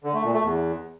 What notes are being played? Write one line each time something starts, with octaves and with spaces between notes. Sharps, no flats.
D3
A3
A#2
A3
E2